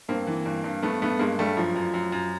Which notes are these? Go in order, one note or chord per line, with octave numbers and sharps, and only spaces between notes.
G2 A#3 C4
E3
G2
G2
G2 A3 B3
G2 A3 B3
G2 G#3 A#3
G2 G3 A3
F#2 F3
F#2
F#2
F#2